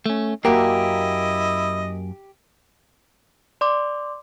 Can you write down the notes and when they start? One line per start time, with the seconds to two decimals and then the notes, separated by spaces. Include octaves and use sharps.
0.06 A3 C#4
0.45 F#2 A#3 E4 G4 D#5
3.61 D5 C6 D6